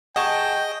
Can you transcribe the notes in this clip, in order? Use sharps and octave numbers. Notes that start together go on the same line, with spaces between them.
G#4 D#5 F#5 G5 A5 C#6